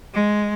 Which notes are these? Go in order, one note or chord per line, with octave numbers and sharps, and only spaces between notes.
G#3